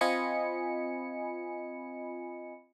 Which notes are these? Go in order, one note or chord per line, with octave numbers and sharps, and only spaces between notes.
C4 F4 D#5 G#5 B5 C#7